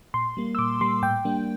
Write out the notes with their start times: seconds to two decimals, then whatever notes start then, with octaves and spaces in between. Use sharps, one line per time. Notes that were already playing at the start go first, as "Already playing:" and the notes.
0.14 A#2 C6
0.37 G3 A#3
0.55 E6
0.59 A#2 D6
0.81 G3 A#3 C6
1.02 A2 G5
1.25 G3 A#3 D4